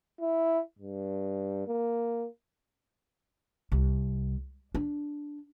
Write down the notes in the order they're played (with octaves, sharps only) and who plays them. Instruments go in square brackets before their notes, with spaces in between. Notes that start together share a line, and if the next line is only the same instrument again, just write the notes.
[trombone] E4
G2
A#3
[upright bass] C2
D4